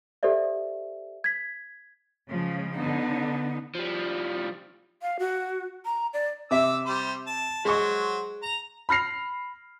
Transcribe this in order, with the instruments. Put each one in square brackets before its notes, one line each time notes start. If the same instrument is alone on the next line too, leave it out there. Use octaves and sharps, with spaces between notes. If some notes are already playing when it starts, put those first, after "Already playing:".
[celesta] G4 A4 C5 D5 E5
G#6 B6
[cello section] C#3 F3 G#3
[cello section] D3 D#4 [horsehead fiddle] B3
[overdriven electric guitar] F3 G3
[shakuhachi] F5
F#4
A#5
D5
[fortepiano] C3 E5 [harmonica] D6 E6
[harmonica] G3 C5
A5
[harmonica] F#3 C5 [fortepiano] G#3 C#6
[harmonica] A#5
[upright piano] B5 F6 A#6 C7 F7